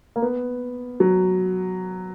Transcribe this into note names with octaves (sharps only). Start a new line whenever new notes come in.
A#3
B3
F#3